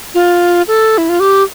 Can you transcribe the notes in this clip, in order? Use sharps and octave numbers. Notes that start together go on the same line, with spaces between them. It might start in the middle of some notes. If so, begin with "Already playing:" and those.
F4
A4
E4
F4
G4